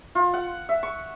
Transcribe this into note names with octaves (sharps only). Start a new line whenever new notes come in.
F4
F#5
E5
C#6